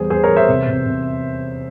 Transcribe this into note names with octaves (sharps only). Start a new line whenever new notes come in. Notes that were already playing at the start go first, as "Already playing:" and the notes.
Already playing: E2 G3 G#4 C5
E2 G#4 C5
A#4 C#5
E2
C5 E5
C3
C3
C3